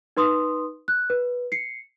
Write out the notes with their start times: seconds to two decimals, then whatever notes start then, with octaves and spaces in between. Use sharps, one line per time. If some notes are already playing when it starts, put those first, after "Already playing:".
0.17 D#4 B4 C6 D#6
0.88 F#6
1.10 B4
1.52 C7 C#7